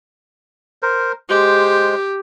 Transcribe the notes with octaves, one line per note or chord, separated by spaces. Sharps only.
A#4 C5
G#3 G4 C5